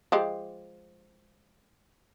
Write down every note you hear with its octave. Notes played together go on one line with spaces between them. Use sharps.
F3 G#3 G4